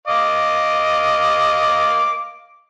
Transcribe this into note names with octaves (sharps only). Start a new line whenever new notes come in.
D#5 F5 D6